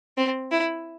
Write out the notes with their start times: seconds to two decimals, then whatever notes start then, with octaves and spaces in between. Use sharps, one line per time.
0.17 C4
0.51 E4